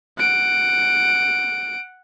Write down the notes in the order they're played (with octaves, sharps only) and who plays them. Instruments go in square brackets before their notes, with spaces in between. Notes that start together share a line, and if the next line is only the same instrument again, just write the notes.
[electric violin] F#5 D7